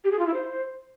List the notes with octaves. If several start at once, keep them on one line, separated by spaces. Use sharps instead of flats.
G4
G#4
F4
E4
C5